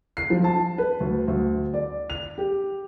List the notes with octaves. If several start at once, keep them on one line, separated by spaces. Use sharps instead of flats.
C7
F3
A5
B4
D2
D2
D5
F7
G4